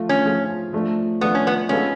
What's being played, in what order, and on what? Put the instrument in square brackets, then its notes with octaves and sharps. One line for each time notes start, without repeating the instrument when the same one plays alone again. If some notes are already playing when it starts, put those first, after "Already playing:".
Already playing: [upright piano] F3 A3 F4
[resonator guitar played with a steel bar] C#4
[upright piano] F3 A3 F4 G#4
F3 A3 D4
[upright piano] F3 A3 D4 [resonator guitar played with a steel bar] B3
[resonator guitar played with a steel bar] C#4
B3
[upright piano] G#3 B3 F4 A4 [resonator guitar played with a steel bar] C#4